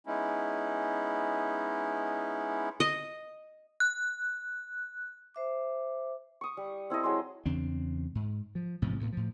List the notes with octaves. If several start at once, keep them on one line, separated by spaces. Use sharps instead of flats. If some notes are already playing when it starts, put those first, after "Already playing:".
G#3 B3 C#4 D#4 E4
D#5
F#6
C5 E5 D6
C#6 D#6
G3
C4 E4 A4 D#5
F#3 G#3 C6
E2 C#3 C4 D4
G#2
F3
A1 G#2 C3 F3
D2 A2 B3
A2 F3